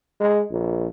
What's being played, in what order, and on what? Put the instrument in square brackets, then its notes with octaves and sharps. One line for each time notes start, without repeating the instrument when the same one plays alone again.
[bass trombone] G#3
A#1